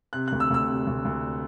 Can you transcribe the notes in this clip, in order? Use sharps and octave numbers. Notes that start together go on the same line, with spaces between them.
C3 F#6
D2 F#6
E6
D2 E6
C3
D2
D2